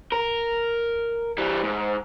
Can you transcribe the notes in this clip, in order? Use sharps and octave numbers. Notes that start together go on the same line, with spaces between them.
A#4
E3 G3
G#2